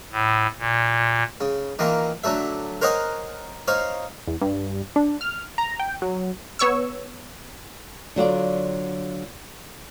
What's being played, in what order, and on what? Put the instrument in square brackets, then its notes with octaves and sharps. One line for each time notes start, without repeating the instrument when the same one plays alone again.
[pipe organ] A2
A#2
[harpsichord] C#3
D#3 E3 A#3 F4
D3 F#3 A3 E5
A#4 C5 C#5 D#5 F#5 G#5
D#4 C5 C#5 F5
[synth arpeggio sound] E2
G2
D4
F6
A#5
G5
F#3
[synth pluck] B3 C#5 C#6 E6
[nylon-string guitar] D3 F#3 F4 D5